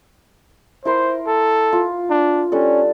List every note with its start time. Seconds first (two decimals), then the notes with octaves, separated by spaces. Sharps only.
0.85 E4 A#4 C5 C6
1.27 A4
1.73 F4
2.10 D4
2.52 G3 C#4 D4 A4